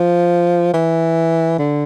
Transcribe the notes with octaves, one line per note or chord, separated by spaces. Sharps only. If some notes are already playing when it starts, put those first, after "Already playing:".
Already playing: F3
E3
D3